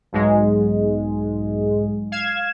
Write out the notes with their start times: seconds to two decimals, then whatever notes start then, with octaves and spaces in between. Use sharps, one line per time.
0.12 B1 G#2 G#3
2.12 F5 G#6 E7